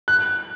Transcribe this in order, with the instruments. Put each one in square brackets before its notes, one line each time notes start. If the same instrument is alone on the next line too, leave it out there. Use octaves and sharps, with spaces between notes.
[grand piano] F#6